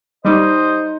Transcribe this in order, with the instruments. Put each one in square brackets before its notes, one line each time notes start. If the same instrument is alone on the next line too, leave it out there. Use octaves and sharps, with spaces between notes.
[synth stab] G3 [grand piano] D#4 [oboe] C5 [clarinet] D#5